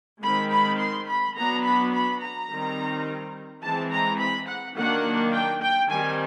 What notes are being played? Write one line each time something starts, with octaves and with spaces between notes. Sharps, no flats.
D#3 G#3 C4 B5
B5
C6
B5
F#3 B3 D4 A#5
B5
B5
A#5
D#3 G3 C4
E3 G#3 C4 A5
A#5
B5
F#5
D#3 F#3 A#3 D4 F#5
G5
G5
D#3 G3 C4 G#5